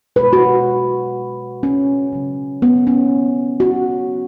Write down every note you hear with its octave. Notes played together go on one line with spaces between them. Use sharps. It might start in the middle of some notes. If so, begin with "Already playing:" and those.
B2 G#3 B4
F#4
C#4
C#3 F#3
B3
C#4
F#4